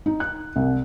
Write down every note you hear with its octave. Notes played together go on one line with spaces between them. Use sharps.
D#4
F#6
C2